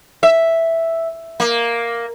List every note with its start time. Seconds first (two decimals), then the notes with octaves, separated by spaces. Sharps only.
0.23 E5
1.40 A#3